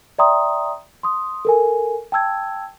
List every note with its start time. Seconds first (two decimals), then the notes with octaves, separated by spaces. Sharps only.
0.19 D5 E5 G5 A#5 C6 D#6
1.03 C6 D#6
1.45 A4 A#4 G#5
2.12 G5 A5 E6 G#6